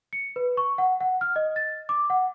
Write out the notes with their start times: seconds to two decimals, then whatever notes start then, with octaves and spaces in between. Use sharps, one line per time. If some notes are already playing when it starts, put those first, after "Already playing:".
0.13 C#7
0.36 B4
0.57 C#6
0.78 F#5
1.01 F#5
1.21 F6
1.36 D#5
1.56 A6
1.89 D6
2.10 F#5